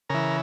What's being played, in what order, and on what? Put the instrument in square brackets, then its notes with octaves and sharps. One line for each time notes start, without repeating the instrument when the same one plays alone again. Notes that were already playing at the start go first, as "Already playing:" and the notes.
[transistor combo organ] C#3 E3 A#4